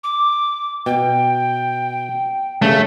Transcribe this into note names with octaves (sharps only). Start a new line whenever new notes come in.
D6
B2 G5
G2 C#3 A3